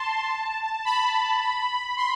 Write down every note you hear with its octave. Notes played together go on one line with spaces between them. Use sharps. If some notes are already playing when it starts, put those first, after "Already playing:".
Already playing: A5 C6
B5
C6